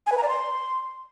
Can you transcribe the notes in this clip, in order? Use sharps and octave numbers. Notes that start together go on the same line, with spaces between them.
G#5
B4
A#5
D5
C6